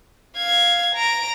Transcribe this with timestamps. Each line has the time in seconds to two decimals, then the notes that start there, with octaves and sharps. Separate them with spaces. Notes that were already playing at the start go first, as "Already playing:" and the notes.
0.37 F5 G#6
0.95 A#5 D7